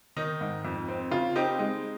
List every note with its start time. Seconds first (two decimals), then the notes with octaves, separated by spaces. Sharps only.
0.17 D#3 D#4
0.41 G#2
0.65 F2
0.89 C4
1.11 C#3 F4
1.35 C4 D#4 G4
1.59 G#3 D#4